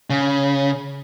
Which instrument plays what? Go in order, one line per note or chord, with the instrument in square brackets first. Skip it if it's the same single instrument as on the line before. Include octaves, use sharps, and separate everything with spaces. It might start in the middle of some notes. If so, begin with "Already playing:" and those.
[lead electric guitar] C#3